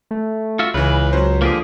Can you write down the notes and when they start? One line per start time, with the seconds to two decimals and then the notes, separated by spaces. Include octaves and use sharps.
0.11 A3
0.59 F4 F#4 E5
0.74 C#2 C#3 E3 B4
1.13 F#3 C#4 C5
1.42 D3 F3 A#3 G4 G#4